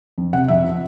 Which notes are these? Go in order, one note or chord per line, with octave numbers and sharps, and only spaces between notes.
F2
C3 F#5
F2 E5
F3